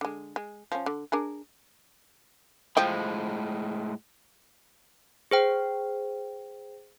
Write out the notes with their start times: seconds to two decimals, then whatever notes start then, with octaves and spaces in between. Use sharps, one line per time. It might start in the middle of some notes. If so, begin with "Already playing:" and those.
0.01 D3 G#3
0.36 G#3
0.72 F3 C#4
0.86 D3
1.12 D4 G#4 A#4
2.77 A2 F3 G#3 G5
5.31 G#4 C5 G5